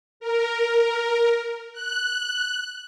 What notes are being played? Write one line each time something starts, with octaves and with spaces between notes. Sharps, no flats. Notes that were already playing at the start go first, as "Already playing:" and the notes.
A#4
F#6